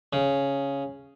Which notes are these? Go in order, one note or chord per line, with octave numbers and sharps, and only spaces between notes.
C#3